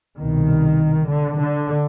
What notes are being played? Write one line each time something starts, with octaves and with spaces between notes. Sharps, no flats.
C2 B2 D#3
D3
D3